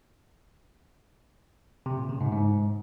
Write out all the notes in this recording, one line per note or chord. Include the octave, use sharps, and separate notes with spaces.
C3
A#2
C#3
G#2
G#2